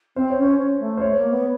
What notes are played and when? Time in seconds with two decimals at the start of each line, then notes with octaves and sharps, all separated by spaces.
0.16 C4 C5
0.30 C#5
0.37 C#4
0.43 C5
0.59 C#4
0.80 A3
0.97 C5
1.01 A3 C#5
1.17 A#3
1.30 B3